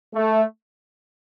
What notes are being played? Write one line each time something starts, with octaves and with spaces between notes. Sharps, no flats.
A3